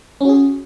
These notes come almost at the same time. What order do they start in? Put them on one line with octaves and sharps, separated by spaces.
C#4 F#4 G#4